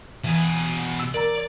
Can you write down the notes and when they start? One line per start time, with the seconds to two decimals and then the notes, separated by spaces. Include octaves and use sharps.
0.24 B2 E3 G#4
0.99 E6
1.14 A#4 D5 A#5